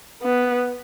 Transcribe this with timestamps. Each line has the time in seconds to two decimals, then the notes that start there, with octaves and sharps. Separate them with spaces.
0.22 B3